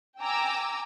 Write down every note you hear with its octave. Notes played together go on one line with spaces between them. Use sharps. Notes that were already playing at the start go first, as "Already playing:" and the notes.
G5 G#5 A#5 D6 E6